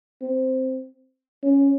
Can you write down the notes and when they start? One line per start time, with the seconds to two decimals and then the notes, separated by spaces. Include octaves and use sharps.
0.22 C4
1.43 C#4